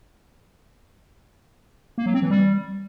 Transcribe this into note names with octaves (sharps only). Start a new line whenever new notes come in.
A#3
F#3
C4
E3
G3